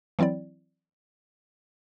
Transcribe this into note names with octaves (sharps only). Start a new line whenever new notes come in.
E3 F#3 C4 E4 D5